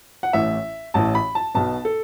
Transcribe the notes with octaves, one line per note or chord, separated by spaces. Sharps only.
F#5
A1 A2 E3 E5
A1 A2 E3 A5
B5
A5
B1 B2 A5
A4